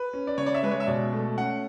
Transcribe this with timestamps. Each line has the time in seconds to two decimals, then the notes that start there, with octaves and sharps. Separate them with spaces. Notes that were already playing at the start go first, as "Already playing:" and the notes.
Already playing: B4
0.13 C#4
0.27 D5
0.38 C#3 C#5
0.46 D5
0.55 E5
0.63 G#3 B4
0.71 C#5
0.80 E5
0.87 B2 D5
1.13 A3
1.38 C#4 F#5